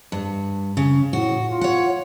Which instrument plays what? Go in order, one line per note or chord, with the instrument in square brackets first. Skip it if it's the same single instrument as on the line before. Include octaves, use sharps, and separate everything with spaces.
[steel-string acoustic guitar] G2
C#3
[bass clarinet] A2 [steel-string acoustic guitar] F#4
[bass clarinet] F4
[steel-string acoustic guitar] C#5 F#5